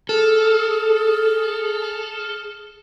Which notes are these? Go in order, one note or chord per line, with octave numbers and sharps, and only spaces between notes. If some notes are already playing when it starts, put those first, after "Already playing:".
G#4 A4 F6